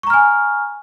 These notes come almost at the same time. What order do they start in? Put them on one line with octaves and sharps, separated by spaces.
C#6 A#5 F6 G#5